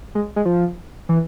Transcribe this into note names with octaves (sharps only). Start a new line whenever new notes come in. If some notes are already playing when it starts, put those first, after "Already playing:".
G#3
G#3
F3
E3